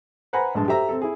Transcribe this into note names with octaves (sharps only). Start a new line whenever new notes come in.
B4 C5 F#5 G#5 A#5 B5
A#1 G2 G#3 A5
G4 A4 C5 E5 A#5
C4 A4
E4 G#4